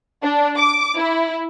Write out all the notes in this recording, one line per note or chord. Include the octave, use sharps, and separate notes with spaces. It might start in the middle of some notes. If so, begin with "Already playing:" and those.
D4
D6
E4